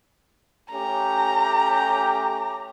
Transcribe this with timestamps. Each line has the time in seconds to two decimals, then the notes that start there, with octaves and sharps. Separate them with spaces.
0.72 A3 C#4 G4 A#5